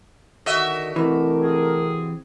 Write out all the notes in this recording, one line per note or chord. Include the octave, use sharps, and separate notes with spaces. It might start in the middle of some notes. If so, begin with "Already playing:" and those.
D3 D#3 F#4 D#5 E5
C3 E3 A3 A#4
C4 G#4